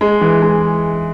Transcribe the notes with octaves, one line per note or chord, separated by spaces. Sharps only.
G#3
E3
G#3